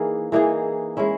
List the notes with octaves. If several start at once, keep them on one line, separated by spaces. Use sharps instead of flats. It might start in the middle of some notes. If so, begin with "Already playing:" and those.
Already playing: E3 A#3 D#4 G#4
E3 A#3 D#4 G#4
G#3 C#4 E4